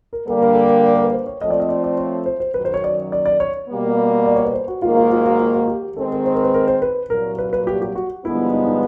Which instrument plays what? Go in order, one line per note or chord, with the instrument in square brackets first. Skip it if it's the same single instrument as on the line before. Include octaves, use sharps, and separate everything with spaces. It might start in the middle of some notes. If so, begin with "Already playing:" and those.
[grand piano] A#4
[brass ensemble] D3 G3 A#3 [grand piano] A4
[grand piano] A#4
A4
A#4
A4
A#4
B4
C5
C#5
[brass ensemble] F3 A3 C4 [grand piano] D#5
[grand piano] D5
D#5
D5
D5
C#5
C5
C5
[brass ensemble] F#2 D#3 F#3 [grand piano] B4
[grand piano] C5
C#5
D5
D5
D5
C#5
[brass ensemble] B2 G3 A#3
[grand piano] D5
C#5
B4
C5
F#4
[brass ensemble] G#2 D#3 F#3 A#3 [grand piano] F4
[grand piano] F4
F4
F#4
F4
F#4
G4
[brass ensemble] D#3 G#3 C4 [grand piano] A4
[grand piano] A#4
C5
A#4
B4
A#4
C5
B4
[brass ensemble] C2 A#2 F#3 [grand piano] A#4
[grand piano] B4
B4
G4
G4
F#4
[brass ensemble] G2 D3 F3 G#3 B3 [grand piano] E4
[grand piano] D#4
D#4